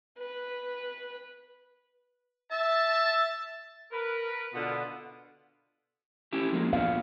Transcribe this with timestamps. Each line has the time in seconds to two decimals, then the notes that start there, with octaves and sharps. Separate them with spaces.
0.18 B4
2.51 E5 A5
3.92 A#4 B4
4.53 B2 D3 B3 F4
6.32 C#4 E4 G4
6.52 F3 G#3 A#3
6.73 A#2 B3 D4 F5